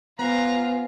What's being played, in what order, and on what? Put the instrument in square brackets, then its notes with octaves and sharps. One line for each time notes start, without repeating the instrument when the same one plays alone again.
[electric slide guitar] B3 [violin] F4 [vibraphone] B4 C5 G#5 [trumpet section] A#5